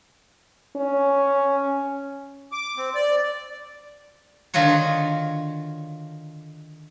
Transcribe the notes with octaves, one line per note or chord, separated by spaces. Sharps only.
C#4
D6
C4
D5
D3 D#3 F4 F#4 C#5